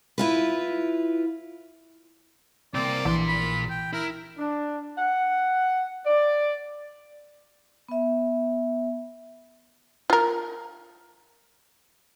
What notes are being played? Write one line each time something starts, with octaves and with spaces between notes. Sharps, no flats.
E4 F4 B4
C2 A#3 C4 D5
A#1 A#2 E3 C6
B5
G5
E4 A#4
D4
F#5
D5
B3 E5
F4 A#4